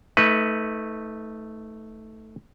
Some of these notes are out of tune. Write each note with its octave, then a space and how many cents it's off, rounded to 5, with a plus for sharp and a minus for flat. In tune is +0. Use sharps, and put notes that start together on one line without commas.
A3 +0 D#4 +30 B4 +0